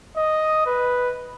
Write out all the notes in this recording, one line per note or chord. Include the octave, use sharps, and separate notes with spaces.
D#5
B4